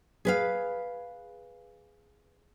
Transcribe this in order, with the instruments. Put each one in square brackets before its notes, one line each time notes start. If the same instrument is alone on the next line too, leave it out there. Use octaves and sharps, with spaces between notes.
[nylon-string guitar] G#4 B4 F5